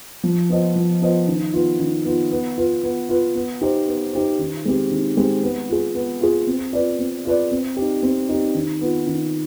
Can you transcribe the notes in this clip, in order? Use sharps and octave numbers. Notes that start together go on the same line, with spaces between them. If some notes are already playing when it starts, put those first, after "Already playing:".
F3
B3 F4 C5 D#5
F3
B3 F4 C5 D#5
D#3
B3 F4
D#3
B3 F4
B3
F4 B4
B3
F4 B4
B3
D#4 G4 C5
B3
D#4 G4 C5
D#3
G#3 C4 G4
D#3
G#3 C4 G4
B3
F4 G#4
B3
F4 G#4
C4
F4 B4 D5
C4
F4 B4 D5
C4
D#4 G4
C4
D#4 G4
D#3
B3 F4
D#3